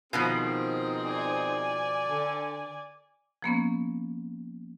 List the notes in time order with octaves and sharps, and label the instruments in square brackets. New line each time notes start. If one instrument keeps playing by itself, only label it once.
[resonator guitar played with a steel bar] B2 D#3 F3 [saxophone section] C4 D#4 G#4
[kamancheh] D5 G#5
[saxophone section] D3
[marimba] F3 A#3 B3 C#4